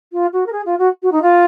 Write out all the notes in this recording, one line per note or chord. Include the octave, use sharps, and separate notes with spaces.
F4
F#4
A#4
G#4
F4
F#4
F#4
D#4
F4